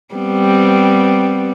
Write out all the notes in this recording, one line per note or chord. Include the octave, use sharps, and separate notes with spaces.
G3 B3 C4